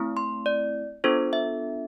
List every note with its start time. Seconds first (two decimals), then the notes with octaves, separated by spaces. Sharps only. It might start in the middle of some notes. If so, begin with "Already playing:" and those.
Already playing: A3 C4 E4
0.17 C6
0.46 D5
1.04 B3 D4 F4 A4 C5
1.33 E5